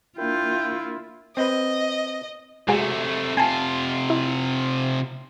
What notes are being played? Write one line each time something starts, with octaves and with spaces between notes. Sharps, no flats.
A#3 D4 E4 F4 A#4 G5
C4 B4 D#5
C3 G#3 A3 F#4 G#4
C3 F4 G#5 A5
E4